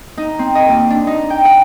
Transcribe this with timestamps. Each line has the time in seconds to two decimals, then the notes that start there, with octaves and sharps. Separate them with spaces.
0.17 D#4
0.39 C4
0.55 D#5
0.69 D#2
0.90 D4
1.07 D#4
1.30 G5
1.45 F#5